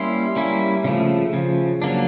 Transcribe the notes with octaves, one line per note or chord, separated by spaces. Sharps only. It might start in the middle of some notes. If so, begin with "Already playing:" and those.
Already playing: G3 A#3 C#4 E4 C6
G3 A#3 C#4 E4
C#3 F3 A3
C#3 F3
F#3 A#3 D4